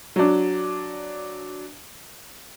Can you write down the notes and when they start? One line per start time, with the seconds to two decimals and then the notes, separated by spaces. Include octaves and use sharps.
0.16 F#3 D4